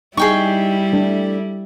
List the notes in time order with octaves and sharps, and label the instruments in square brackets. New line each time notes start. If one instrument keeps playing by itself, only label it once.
[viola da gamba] G3 E4 [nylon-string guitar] D#4 [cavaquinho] G#4 G5 C#6
[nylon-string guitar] A3 D4